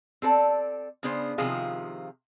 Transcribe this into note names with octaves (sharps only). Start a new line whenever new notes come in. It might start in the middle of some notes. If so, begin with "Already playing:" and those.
C4 A4 A#4 D5
C#3 B3 D4 G#4 C5
C3 D#3 F3 F4 G#4